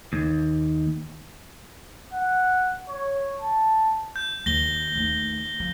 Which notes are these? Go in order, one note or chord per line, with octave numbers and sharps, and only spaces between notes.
D#2
F#5
C#5
A5
G6
D#2 D#3 A#6 G7
D#2 A3
F3